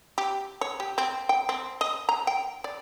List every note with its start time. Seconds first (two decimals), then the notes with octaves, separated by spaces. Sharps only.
0.18 G4
0.61 C#5
0.80 G4
0.98 C4
1.29 G5
1.49 C4
1.81 D#5
2.09 A#5
2.27 G5
2.64 D5